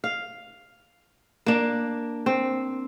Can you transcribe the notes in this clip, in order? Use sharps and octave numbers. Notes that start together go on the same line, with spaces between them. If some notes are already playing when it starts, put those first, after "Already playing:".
F5
A#3 D4
C4